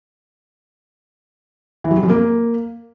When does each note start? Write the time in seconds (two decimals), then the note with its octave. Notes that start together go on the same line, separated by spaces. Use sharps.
1.84 E3
1.91 F#3
1.97 G3
2.03 F#2
2.10 A#3